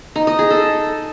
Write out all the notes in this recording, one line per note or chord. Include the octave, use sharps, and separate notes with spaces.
D#4
D#5
G#4
A4